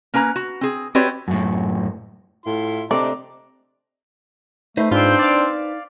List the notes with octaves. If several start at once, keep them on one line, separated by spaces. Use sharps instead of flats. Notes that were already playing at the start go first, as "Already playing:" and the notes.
A#3 C#4 B4 A#5
F#4
C4 G#4
C4 F#4 G4 B4 C#5 D5
F#2 A2
A2 E4 F4 C6
C3 A3 C4 D4 D5 D#5 A#5
A3 D#4 B4 C5
G#2 C4 D4 F4 G6
D5 F5